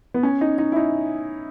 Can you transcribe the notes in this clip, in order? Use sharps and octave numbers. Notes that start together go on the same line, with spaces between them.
B3
C#4
D#4
D#4
E4
D#4